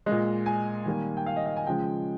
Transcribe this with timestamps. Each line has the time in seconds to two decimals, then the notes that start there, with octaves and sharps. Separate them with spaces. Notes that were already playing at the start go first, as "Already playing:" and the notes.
0.06 A#2 G#3 D#5
0.46 G#5
0.86 D#3 G3 A#3
1.17 G5
1.26 F5
1.36 D#5
1.46 F5
1.56 G#5
1.66 C#3 F3 G#3 G5